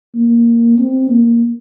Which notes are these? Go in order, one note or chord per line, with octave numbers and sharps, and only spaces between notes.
A#3
C4
A#3